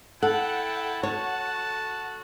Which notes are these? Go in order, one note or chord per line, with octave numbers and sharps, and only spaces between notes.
E4 A4 F#5 G5 A5
F#4 A4 C#5 A5